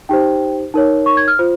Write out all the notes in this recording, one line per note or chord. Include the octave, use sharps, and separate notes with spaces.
D#4 G4 C5 G5
D#4 A#4 C#5
C#6
G#6
F6
F4 C5